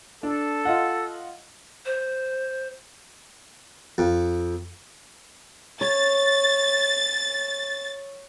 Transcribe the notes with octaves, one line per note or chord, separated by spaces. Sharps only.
D4 A4
F4 D#5 F#5
C5
F2
C#5 A6